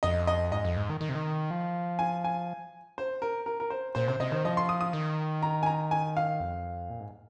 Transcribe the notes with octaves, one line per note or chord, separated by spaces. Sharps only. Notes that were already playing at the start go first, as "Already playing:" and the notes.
F2 D#5
D#5
G#2 D#5
F2
G#2
D#3
D#3
C3
D#3
F3
G#5
G#5
C5
A#4
A#4
A#4
C5
A#2 C5
C3 C5
C3 D#5
D#3 C5
F3 D#5
C6
D#6
D#6
D#3
A#5
G#5
A#5
G#5
F5
F2
A#2
G#2